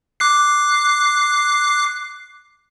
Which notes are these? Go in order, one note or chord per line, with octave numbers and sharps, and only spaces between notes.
D6 F#6 C7